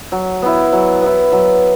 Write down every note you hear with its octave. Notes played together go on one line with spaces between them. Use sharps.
F#3
B3 E4
F#3
B3 E4
F#3